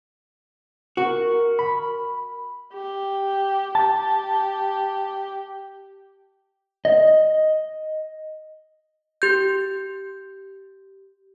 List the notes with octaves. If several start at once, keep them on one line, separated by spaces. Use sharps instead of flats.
F#4 A#4
B5
G4
G4 A5
D#5
G4 G6